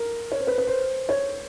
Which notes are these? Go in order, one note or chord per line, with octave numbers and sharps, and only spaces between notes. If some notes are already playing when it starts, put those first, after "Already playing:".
Already playing: A#4
C#5
C5
B4
B4
C5
C#5